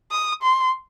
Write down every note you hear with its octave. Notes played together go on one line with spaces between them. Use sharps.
D#6
C6